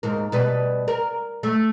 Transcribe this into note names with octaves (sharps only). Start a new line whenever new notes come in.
D#2 G#2 A#4
B2 G3 B4
A#4
A3